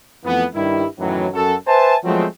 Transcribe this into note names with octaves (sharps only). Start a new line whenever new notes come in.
F2 E3 A3 B3
G2 D#3 G3 E4
F#2 A2 D#3 E3 F#3
F#2 F#4 A4
B4 C5 E5 G#5 A5
F3 F#3 G#3 A3 B3 C4